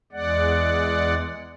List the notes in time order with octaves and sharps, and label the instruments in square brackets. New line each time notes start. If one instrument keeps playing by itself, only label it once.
[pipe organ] E2 G#3 D5 F#5